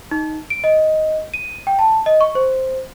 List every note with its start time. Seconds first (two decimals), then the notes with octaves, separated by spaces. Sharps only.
0.11 D#4
0.50 D7
0.64 D#5
1.34 D#7
1.67 G5
1.79 A5
2.06 D#5
2.21 C#6
2.35 C5